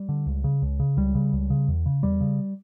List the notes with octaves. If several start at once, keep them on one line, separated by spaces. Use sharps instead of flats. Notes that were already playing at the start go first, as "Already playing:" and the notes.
Already playing: G3
D3
C#2
C#3
C#2
C#3
C#2 G3
C#3
C#2
C#3
E2
C#3
E2 G3
C#3